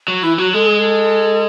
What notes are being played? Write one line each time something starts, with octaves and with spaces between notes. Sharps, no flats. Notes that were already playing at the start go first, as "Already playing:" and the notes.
F#3
E3 E4
F#3 F#4
G#3 A4
G#4
A4